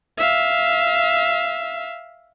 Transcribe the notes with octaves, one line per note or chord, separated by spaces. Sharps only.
E5 F5